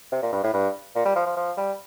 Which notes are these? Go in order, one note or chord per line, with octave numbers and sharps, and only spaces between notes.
C3
A#2
G2
A2
G2
A#2
G3
F3
F3
F3
G3